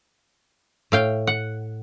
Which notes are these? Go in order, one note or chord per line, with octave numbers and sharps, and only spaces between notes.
A2 F5 G5
F#5